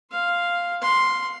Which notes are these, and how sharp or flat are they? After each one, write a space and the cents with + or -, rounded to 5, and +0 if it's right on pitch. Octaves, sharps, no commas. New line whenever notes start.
F5 +0 C6 +0
F#5 -45 C6 +0